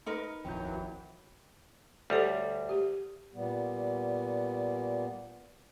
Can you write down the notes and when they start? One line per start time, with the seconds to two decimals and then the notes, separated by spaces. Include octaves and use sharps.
0.06 D#4 A#4 B4
0.45 D#1 A#1 F2 E3 F#3 G5 B5 G6
2.10 D2 G3 G4 A4 C#5
2.69 G4
3.34 A#2 G3 B3